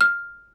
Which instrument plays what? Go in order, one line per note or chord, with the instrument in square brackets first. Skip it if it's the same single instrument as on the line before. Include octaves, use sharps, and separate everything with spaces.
[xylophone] F6